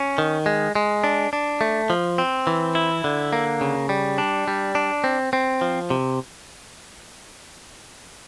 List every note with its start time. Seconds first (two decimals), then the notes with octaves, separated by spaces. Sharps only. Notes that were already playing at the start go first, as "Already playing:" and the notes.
Already playing: C#4
0.18 D#3
0.46 G#3
0.75 G#3
1.04 D4
1.33 D4
1.61 A3
1.90 F3
2.18 C4
2.47 E3
2.75 E4
3.04 D3
3.33 A#3
3.61 C#3
3.89 G3
4.18 D4
4.48 G3
4.75 D4
5.04 C4
5.33 C4
5.61 F3
5.90 C3